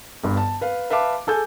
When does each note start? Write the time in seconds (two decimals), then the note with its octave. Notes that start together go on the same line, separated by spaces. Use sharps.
0.24 G1 G2
0.37 A5
0.61 B4 F5
0.90 B4 E5 F5 A5 D6
1.27 G#4 A4 G#5 G6